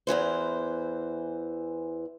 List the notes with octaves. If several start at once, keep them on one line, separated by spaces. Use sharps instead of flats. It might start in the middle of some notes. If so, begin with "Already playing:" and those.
E2 C3 E3 C5